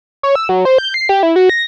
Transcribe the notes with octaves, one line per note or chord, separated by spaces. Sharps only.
C#5
E6
F#3
C5
G6
C7
G4
E4
F#4
A#6